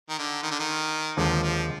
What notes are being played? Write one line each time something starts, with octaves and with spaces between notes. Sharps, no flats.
D#3
D3
D#3
D3
D#3
D#2 D3 F3 G#3
F3